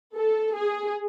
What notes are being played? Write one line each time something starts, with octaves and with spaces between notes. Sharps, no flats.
A4
G#4